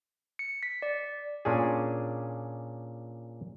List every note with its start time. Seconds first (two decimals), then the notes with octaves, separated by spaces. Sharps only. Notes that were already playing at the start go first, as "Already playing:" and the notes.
0.39 C#7
0.63 B6
0.82 D5
1.45 A#2 C#4 D4 G#4